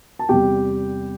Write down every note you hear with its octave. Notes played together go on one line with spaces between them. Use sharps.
A5
E2 C3 G3 G4 G5